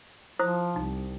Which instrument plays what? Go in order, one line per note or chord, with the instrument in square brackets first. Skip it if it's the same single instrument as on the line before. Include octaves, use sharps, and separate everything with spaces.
[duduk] F3 [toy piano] E4 C5 D#6
[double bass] C2 [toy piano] D#4